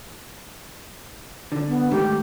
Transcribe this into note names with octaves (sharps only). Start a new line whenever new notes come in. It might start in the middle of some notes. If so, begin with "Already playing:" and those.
D3
B3
G#2 D#3 A3 G4